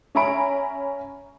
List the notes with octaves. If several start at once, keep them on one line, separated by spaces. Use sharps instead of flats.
C#4 E5 G#5 A#5 B5 D7